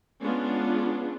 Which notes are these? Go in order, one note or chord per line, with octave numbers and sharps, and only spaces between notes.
G#3 B3 C#4 D4 F4